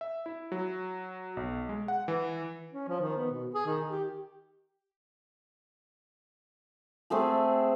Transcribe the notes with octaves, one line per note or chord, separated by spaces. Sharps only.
E5
E4
F#3
B1
G#3
F#5
E3
C#4
F3
D#3
B3
B2
G#4
D#3
G4
A3 C4 G#4 A4